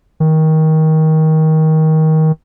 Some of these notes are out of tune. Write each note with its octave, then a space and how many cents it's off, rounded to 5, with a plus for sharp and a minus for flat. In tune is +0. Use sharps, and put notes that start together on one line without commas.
D#3 +20